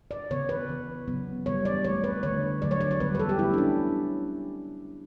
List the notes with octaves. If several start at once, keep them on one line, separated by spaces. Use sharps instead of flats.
D5
C#3 E3 B3 C#5
B4
E3 B3
C#3 F#3 B3
E3 G3 B3 C#5
D5
E3 A3 C#5
B4
D3 A3 C#5
D3 F#3 A3 D5
C#5
D5
C#5
E3 G3 B3 B4
B4
A4
G4
E3 A3 E4
D4
C#4